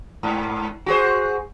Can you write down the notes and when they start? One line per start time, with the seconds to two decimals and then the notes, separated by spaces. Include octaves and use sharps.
0.23 G#2
0.86 F#4 G#4 C5